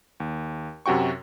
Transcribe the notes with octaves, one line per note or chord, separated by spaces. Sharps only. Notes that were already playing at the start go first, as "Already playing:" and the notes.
D#2
F#2 C3 F#4 G5 C#6